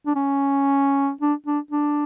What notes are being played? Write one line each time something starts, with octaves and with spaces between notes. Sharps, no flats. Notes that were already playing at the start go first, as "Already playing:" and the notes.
D4
C#4
D4
D4
D4